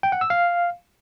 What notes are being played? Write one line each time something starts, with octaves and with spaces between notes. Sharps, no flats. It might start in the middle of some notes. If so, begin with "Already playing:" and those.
G5
F#5
E6
F5